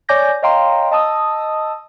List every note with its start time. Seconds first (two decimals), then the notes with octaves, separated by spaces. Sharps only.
0.09 C#5 D5 G#5 D6 G6 A#6
0.42 C#5 D#5 F5 G5 A#5 C6
0.91 D#5 A5 D#6 E6